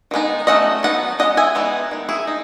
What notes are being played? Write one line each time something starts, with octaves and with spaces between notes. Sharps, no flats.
D#3 G#3 B3 D#4
F#3 A3 C#4 D#5 F#5
F#3 B3 D#4 F#5
G#3 C#4 D#5 F#5
E5 G#5
E3 G#3 B3 D#4
D#3 G#3
E4 G#4
D#4